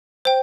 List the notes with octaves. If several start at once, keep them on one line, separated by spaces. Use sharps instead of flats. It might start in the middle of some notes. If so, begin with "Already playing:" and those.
C5 G5